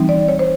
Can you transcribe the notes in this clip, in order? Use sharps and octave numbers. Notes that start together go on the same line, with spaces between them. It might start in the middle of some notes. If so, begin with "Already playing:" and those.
Already playing: E3 G3 C4 D#4
D5
C#5
C5